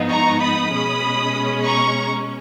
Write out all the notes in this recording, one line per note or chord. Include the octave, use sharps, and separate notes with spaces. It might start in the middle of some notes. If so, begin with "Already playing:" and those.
Already playing: G#2 F3 B3 D#4
A#5 C#6
B5 D#6
B2 G#3 C#4
A#5 C#6